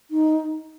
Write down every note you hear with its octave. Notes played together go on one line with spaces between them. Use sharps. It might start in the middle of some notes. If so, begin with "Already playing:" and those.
D#4